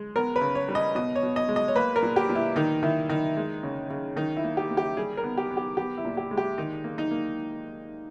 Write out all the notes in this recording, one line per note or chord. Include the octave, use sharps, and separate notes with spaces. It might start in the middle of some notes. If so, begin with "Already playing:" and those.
Already playing: G#3
B3 A#4
B4
C#3
C#5
G3
D#5
B2 D#5
C#5
B2
D#5
G#3
D#5
C#5
A#3 B4
A#4
A#2
G4
A#2
E4
D#3 D#4
D#3 E4
D#3 D#4
G#3
C#3
C#3
D#3 D#4
E4
A#3
G4
A#3
G4
G3 G#4
A#4
B3
G4
B3
G4
B3 G4
E4
A#2
G4
G#3
G4
D#3 D#4
A#3
D#4
A#3